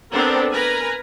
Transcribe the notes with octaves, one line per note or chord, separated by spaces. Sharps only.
B3 C4 D4 A4 A#4 C5
A#4 B4 G#5 A#5